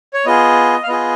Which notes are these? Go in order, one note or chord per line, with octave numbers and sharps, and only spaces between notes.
C#5
B3 F4 G#4 D#5
F5
B3 F4 G#4 D#5